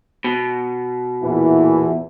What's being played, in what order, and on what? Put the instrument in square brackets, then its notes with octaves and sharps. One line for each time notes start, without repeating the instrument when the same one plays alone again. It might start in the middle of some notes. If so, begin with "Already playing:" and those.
[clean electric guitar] B2
[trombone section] E2 A#2 E3